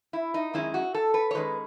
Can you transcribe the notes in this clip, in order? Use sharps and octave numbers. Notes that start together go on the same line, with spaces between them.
E4
D#4
F#2 D#3 G#3 C#4 E4
F#4
A4
B4
C#5
D#3 G#3 C#4 B4